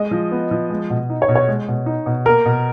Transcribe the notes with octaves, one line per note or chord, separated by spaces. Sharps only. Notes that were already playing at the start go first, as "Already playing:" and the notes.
Already playing: G#3 D#5
F3
B3
F3
G#3
B2
D#4
C#5
B2
C#5
G#3
B2
D#4
B2
A#3 A#4
B2